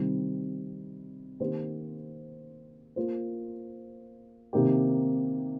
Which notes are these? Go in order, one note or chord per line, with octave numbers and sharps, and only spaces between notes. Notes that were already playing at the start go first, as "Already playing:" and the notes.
Already playing: C3 D#3 G3 C4
D#3 A#3 G4 C5
A#3 F4 C5
C3 D#3 A#3 D#4 G4